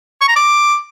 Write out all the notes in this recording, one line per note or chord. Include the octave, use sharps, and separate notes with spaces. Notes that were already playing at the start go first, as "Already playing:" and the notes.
C#6
A#5
D6